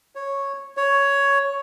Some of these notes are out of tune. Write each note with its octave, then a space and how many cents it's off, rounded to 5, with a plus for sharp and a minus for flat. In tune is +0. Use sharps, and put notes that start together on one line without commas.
C#5 -5
C#5 +10